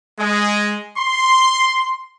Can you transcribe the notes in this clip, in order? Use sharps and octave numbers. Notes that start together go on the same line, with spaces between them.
G#3
C6